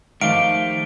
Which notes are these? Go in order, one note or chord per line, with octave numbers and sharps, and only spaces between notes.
D#3 F3 A3 G4 F5 D7